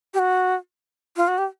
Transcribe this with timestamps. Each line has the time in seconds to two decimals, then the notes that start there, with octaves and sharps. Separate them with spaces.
0.14 G4
0.19 F#4
1.16 F4
1.28 F#4
1.38 G4